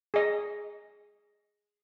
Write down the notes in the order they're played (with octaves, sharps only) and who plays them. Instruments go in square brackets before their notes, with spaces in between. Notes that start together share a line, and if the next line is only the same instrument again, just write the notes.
[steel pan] G#4 D#5